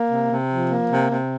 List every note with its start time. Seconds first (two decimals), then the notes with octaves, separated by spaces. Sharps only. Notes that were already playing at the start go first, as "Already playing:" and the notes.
Already playing: A#3
0.10 C3
0.30 C3
0.50 F3
0.70 A#3
0.89 C3
1.10 C3